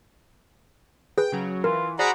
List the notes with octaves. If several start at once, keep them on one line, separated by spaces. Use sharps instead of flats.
G#4 B4 G5
C#3 F#3
E3 F4 A#4
F#4 G#4 C5 D5 F#5 A#5 B5